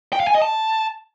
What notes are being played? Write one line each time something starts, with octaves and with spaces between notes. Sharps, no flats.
G5
F5
G#5
D#5
A5